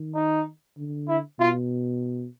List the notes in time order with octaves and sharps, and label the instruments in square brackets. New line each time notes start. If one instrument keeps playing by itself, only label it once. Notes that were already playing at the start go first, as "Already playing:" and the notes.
Already playing: [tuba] D#3
[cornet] D#4
[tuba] D3
[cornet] E4
[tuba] B2 [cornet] F4